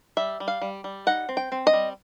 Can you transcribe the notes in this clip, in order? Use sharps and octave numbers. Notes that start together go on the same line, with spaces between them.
G3 E5
G3
F5
G3
G3
D#4 F#5
C4
G5
C4
D#5
G3